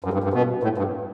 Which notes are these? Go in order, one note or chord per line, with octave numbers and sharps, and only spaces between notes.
F#2
G2
G2
B2
A2
G2